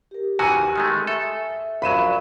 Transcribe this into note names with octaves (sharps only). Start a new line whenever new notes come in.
G4 A#4
D#3 E3 F#4 G#5 D#7
D#3 G#3 A3
A4 E5
A#1 F#3 F5 B5 D#7 E7